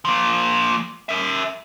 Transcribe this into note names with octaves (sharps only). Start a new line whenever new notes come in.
F3 A#3
A#4 E5